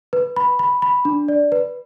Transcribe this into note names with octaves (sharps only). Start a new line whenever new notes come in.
B4
B5
B5
B5
D4
D5
B4